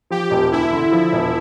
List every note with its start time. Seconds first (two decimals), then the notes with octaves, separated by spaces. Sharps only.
0.10 F3 G4
0.31 E1
0.51 D2 E4
0.72 D3
0.92 F3
1.13 E1